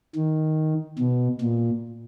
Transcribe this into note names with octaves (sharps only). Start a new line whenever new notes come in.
D#3
B2
A#2